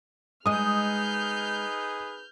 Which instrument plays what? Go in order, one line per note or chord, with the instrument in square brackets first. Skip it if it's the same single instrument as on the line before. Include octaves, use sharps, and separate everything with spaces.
[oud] G#3 D#5 [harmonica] D#4 G#4 B4 [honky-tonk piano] D#6 [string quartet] F6 G6